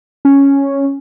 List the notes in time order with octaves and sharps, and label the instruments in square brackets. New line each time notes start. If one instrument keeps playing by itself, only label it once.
[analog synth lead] C#4